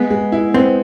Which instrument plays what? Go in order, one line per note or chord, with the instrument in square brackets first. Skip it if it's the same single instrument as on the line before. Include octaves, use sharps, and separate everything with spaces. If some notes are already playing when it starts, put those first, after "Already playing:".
Already playing: [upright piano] G#3 [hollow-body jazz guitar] B3
[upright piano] G#3
E4
[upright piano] B3 [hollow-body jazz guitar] C4